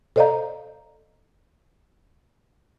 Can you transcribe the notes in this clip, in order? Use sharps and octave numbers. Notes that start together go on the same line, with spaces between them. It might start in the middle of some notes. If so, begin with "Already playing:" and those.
A4 C5 D5 D#5 F5 A#5